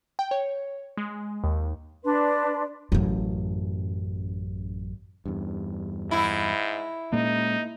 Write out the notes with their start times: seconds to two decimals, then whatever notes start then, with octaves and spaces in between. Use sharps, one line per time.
0.19 G5
0.31 C#5
0.97 G#3
1.44 D#2
2.04 D4 B4 D5 C6
2.92 A1 F#2
5.26 E2 G2
6.11 G#2 E4
7.13 A#2 G#3 A#3 C#4 D#4